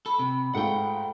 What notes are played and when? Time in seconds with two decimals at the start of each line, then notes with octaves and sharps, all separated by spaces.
0.06 A4 B5
0.19 C3
0.55 G#2 A3 F4 F#5 G5